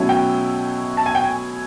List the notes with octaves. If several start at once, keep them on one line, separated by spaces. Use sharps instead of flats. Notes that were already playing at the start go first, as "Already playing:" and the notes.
Already playing: B2 F#3 A3 C#4 E4
G5
A5
G#5
G5
G#5